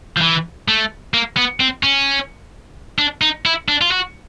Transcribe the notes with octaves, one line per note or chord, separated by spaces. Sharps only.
F3
E3
A3
A#3
B3
C4
C#4
D4
D#4
E4
D4
F4
F#4